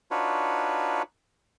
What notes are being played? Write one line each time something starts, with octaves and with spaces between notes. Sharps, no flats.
D4 D#4 F4 F#4 B4 C#5